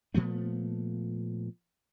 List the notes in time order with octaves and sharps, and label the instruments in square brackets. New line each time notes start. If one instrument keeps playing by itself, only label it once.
[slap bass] A#2 F3 A3 B3